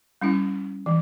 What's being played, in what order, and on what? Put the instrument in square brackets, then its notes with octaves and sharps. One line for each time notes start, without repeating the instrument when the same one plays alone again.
[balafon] G3 C#4 E4
E3